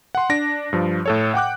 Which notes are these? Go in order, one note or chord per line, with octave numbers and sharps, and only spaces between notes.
F#5 C6
D4 A#6 D7
G2 F3
A2 A4 C#5
F#5 G5 D6 F#6